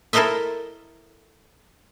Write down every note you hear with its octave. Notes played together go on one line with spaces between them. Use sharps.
E4 A4 A#4 C5 D#5 E5